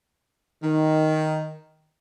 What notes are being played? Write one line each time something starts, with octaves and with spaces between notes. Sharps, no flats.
D#3